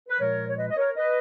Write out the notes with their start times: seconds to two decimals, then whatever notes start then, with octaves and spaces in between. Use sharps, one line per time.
0.09 B4
0.19 A#2 F3 G#3 A#4 C#5
0.49 C#5
0.57 B4 D#5
0.70 D#5
0.76 A#4 C#5
0.96 B4 D#5